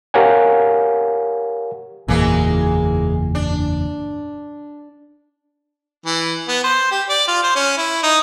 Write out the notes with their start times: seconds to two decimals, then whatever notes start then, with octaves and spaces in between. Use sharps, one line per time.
0.14 G4 A#4 C#5 F5 F#5 G#5
2.08 F#1 E2 A#2 E3 G#3 A#3
3.35 D4
6.06 E3
6.48 B3
6.64 C5
6.91 G4
7.09 D5
7.28 F4
7.43 C5
7.55 C#4
7.77 E4
8.03 D#4